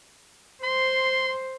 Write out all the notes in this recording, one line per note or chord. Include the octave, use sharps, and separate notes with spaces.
C5 C6